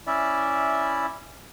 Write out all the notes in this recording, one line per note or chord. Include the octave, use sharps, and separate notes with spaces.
C#4 E4 D5 E5